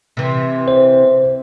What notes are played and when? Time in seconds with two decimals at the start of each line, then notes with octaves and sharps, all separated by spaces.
0.17 C3 E3
0.68 C5